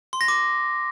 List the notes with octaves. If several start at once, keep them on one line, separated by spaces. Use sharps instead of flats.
C6
A#6
D6